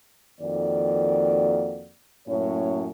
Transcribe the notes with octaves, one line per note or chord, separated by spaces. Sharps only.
F2 D#3 A#3 F#4 D5
F#2 A2 A#3 C#4 C#5